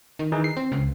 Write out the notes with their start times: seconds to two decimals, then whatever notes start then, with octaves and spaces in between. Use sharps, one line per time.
0.19 D#3
0.32 E3 D#4 G#4
0.44 C7
0.57 C4
0.72 C#2